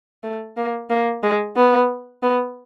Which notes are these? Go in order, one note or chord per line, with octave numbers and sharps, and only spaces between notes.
A3
A#3
A#3
G#3
B3
B3